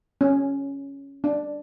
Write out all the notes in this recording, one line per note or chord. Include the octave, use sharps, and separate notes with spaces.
C#4
D4